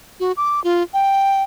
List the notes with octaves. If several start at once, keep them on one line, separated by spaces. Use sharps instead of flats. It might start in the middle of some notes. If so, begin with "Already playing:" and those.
F#4
D6
F4
G5